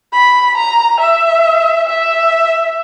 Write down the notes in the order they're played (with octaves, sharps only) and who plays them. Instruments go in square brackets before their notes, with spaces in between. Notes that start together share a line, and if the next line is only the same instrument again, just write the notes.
[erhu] B5
A#5
E5
E5